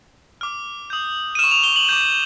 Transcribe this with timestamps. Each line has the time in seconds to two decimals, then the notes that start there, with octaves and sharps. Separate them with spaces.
0.41 D6 F6
0.90 D#6 G6
1.35 D#7
1.39 F6 E7
1.44 C#6
1.51 F7
1.63 G7
1.76 F#7
1.89 D6 G6